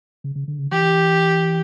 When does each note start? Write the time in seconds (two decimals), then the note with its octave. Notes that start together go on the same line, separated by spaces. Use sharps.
0.24 C#3
0.36 C#3
0.48 D3
0.59 C#3
0.72 E3 G4